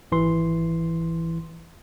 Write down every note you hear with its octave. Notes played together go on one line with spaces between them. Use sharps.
G#1 E3 C6